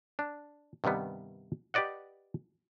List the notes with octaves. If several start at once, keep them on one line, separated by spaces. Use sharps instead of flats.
D4
G2 C3 D#3 G3 B3
G4 B4 D5 D#5 F#5